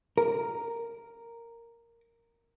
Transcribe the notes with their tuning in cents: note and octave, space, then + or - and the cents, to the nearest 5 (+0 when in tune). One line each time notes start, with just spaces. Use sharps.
A#4 -5